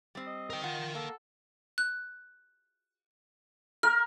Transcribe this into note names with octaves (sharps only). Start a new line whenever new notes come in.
G3 C4
D#5
A#4 G5
F4 F#5
A#3 A4
F#6
A#4 F6